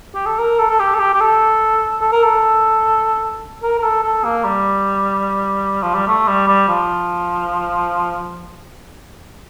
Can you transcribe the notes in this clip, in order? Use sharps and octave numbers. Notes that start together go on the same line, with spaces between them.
G4
A4
A#4
A4
A4
G4
A4
G4
G4
A4
A4
A#4
A4
A#4
A#4
A4
A4
A#3
G3
F3
G3
A3
G3
G3
F3